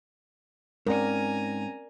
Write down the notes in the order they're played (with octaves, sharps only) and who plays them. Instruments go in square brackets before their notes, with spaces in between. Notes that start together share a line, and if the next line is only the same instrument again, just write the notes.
[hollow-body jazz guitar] G#2 [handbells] C4 C#4 [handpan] A#4 D5 [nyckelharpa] G#5 A#5